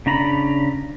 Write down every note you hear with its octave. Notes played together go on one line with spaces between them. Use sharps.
C#3 D4 A#5 B5